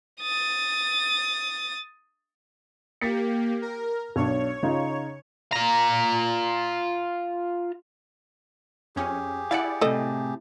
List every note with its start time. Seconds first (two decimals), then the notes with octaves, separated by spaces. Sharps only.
0.22 D#6 A6
3.01 A#3 G4 A6 B6 C#7
3.62 A#4
4.16 B1 D4 C#5
4.63 C#3 D#4 F4
5.52 F4 A#5
8.96 F2 C#4 G4 G#4
9.51 E4 D5 F5 F#5
9.81 A2 C3 A4 D#5